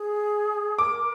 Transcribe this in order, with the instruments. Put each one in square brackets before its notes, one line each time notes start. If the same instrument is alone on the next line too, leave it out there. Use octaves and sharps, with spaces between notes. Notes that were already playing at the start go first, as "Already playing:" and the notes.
Already playing: [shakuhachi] G#4
[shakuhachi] A#4 [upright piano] D6